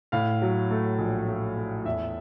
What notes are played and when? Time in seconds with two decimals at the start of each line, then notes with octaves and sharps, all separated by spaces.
0.12 A2 F5
0.42 F#3
0.70 A3
0.98 A#1
1.28 A3
1.57 A3
1.85 E2 E5